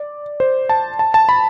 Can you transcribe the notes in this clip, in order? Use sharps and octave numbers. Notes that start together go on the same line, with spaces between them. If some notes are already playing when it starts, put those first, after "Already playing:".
Already playing: D5
C5
A5
A5
A5
B5